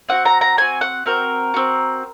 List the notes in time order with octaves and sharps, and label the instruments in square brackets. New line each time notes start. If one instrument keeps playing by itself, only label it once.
[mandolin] C4 F#4 F#5
A#5
A#5
C4 F#4 G#5
F#5
C4 F#4 A#4
C4 F#4